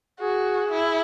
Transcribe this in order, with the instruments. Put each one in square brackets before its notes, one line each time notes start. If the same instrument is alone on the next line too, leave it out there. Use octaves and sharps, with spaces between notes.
[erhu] F#4 [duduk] G#4
[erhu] E4